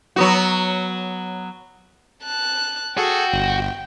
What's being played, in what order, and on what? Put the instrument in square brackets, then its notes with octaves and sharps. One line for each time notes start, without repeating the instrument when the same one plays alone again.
[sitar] F#3 B3 F#4
[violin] A5 F#6
[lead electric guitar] F#4 [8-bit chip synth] G#4 A4 [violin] G5
[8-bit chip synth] G1